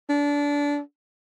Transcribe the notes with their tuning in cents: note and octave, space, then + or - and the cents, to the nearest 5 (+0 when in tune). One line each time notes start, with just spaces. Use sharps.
D4 -25